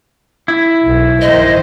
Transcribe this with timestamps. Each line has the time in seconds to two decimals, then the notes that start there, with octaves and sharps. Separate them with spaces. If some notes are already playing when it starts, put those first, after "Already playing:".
0.48 E4
0.86 B1
1.21 D#3 C5 D#5